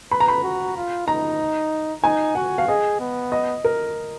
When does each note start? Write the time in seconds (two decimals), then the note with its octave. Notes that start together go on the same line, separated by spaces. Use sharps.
0.11 B4 B5
0.20 A#5
0.28 B5
0.43 F#4
0.76 F4
1.07 D#4 A#5
2.03 D#4 G#5
2.35 F#4 F#5
2.58 F5
2.68 G#4 D#5
3.00 B3
3.32 D#5
3.64 A#4